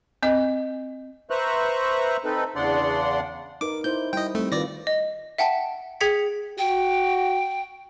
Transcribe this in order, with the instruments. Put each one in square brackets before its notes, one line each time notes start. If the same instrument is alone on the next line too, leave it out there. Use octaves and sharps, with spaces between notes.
[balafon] C4 D#5
[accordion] B4 C5 E5 A#5 C#6 F#6
C4 D#4 A4 B4
E2 C#3 D4 D5 F#5 C6
[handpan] D#4 A#4 B4 [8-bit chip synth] D6
[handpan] D#4 E4 C5 [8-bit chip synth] G6
[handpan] G3 E4 [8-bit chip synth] D#5 G5
[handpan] G3 C4 [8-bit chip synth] A3
[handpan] D#3 F4 B4 [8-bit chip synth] D5 A#6
[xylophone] D#5
E5 F#5 G5 A5
G#4 G5 G#6 B6 C#7
[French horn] F#4 [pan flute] G5